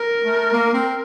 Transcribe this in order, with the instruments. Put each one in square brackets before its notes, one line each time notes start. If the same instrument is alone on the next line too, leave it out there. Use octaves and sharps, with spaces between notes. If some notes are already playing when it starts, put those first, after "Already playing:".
Already playing: [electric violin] A#4
[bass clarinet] A3
A#3
C4